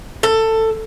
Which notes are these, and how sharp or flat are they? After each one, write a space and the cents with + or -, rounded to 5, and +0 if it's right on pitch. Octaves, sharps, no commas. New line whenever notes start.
A4 +15